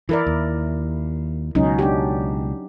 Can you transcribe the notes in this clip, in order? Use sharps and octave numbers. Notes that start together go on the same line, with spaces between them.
E3 E4 A#4 D5
D#2
C#2 B2 F#3 C#4 D#4
D4 D#4 G4